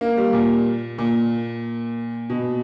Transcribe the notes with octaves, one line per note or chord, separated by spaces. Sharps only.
A#3
G3
A#2
A#2
B2